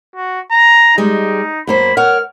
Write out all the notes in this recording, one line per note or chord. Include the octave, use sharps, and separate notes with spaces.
F#4
A#5
G3 G#3 D#4
F#2 A#3 C5 B5
A#4 C#5 F#5 F6